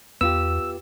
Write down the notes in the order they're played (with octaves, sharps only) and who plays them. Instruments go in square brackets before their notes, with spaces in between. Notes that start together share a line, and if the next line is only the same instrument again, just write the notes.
[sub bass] E2 [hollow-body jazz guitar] B3 F4 G4 [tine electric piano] E6